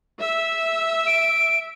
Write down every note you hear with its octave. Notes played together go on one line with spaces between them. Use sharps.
E5
D7